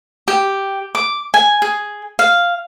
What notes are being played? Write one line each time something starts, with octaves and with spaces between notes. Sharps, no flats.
G4
D6
G#5
G#4
F5